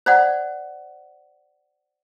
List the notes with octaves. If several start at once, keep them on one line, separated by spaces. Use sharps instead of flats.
C5 D5 F#5